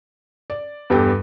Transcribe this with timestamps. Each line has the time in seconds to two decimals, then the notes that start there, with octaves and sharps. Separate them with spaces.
0.50 D5
0.90 E2 G2 G3 A4 G5